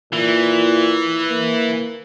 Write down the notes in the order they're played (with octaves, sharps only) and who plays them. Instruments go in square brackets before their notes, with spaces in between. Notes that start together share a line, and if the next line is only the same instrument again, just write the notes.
[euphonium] A#2 [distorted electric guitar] E3
[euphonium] A#3